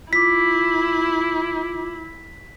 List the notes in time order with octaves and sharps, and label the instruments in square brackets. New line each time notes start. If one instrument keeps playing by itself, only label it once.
[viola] E4 [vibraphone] F4 D6 [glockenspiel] B6